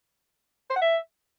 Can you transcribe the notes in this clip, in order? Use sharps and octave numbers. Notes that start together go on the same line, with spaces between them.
C5
F#5
E5